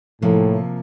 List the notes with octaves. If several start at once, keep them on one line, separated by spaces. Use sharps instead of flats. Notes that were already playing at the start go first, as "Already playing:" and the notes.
A2 C3 F3 A#3